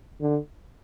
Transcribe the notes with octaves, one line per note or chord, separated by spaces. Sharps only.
D3